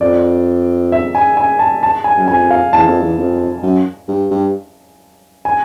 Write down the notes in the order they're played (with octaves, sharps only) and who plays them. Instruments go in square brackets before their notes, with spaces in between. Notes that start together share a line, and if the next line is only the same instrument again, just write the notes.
[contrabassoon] F2 [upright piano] D5
[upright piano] E5
G#5
G#5
A5
A5
G#5
[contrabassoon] F#2
[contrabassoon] F2 [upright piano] G#5
[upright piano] F5
[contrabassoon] E2 [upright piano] A5
[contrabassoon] F2
E2
F2
F#2
G2
G2
[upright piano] G#5